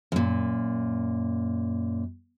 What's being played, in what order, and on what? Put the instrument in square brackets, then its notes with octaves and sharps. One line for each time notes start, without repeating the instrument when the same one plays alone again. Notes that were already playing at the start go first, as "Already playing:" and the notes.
[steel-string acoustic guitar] F#2 A#2